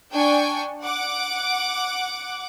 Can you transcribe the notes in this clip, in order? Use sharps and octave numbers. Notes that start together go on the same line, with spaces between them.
D4 G5 G#5 C#6
F#5 D6